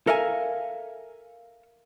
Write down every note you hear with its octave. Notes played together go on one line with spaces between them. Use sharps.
A4 A#4 E5 F5 G5 G#5